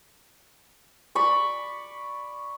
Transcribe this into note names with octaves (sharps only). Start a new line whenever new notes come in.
D5 B5 C#6